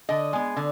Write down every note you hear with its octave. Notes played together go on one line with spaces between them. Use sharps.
D3 D#5
G#3 B3
D3